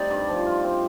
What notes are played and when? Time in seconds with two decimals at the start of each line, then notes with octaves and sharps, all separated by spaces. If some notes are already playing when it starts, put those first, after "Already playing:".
Already playing: G3 A3 C4 D#4 G4 D5
0.10 G2
0.28 F3
0.47 F4
0.64 C4